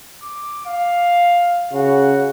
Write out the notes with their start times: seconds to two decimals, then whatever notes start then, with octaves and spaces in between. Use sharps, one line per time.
0.22 D6
0.66 F5
1.73 C#3 F#4